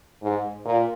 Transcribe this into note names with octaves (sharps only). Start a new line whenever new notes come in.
G#2
A#2